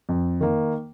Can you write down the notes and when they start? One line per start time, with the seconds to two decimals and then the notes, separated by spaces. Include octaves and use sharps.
0.09 F2
0.40 D#3 A#3